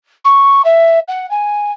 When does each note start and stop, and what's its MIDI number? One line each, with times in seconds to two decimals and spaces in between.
0.25 0.62 85
0.65 0.99 76
1.08 1.29 78
1.31 1.72 80